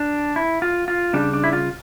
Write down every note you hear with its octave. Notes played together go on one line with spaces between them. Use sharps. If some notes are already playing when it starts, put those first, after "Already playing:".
Already playing: D4
E4
F4
F4
C#3 G3 D4
D4
E4
F4